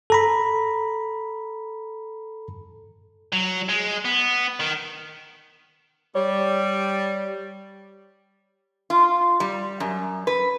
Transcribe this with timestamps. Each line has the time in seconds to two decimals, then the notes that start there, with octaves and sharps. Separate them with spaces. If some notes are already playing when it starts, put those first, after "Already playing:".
0.10 A4 A#5 B5
3.33 F#3
3.69 G#3
4.05 B3
4.60 D#3
6.15 G3 C#5
8.90 F4
9.40 G3
9.80 F#2
10.27 B4